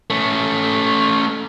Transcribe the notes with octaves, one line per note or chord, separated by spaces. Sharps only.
A3 C#4